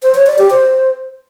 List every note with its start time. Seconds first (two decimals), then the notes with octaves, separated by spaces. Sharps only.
0.03 C5
0.15 C#5
0.27 D5
0.38 G4
0.50 C5